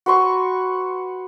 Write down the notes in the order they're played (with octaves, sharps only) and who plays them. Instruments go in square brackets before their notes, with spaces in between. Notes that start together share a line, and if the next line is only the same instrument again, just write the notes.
[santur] F#4 B4 C6 C#6